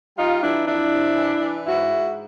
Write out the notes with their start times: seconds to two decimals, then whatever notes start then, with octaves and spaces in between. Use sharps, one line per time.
0.17 G3 D#4 F4
0.42 E3 D4 E4
0.66 F2 D4 E4
0.91 C3
1.16 E3
1.40 E3
1.66 G#2 E4 F#4
1.90 G#2